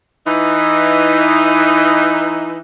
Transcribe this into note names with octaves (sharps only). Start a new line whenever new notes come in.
E3 D#4